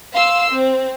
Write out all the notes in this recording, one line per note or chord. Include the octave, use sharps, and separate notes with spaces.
F5 C6 E6
C4